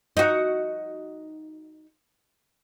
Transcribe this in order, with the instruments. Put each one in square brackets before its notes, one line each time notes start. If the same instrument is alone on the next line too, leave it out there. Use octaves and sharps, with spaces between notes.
[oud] D#4 F#4